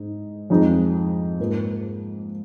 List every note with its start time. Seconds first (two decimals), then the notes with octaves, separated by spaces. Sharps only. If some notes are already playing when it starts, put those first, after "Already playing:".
Already playing: G#2 G#3 D#4
0.50 F2 F3 G#3 D#4
1.40 G#2 F3 A#3